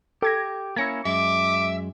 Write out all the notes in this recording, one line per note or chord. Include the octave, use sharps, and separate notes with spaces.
G4 A4 G#6 A#6
A#3 C#4 E4 G#6 A#6 C#7
F#2 G#3 E5 D6